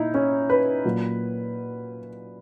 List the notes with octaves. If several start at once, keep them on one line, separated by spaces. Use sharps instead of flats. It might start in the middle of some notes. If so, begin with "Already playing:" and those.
Already playing: A#2 D#4 E4
C#4
B4
A#2 F#3